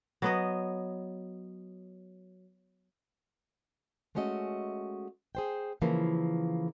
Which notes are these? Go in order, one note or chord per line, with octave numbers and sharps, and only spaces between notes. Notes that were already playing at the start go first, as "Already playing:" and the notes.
F#3 B3 D#5
G#3 A3 C#4 F#4 D#5
G#4 C5 G5
C#3 E3 F3 A#3